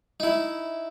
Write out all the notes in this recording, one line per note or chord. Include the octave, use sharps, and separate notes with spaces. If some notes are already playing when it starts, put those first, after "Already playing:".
D#4 E4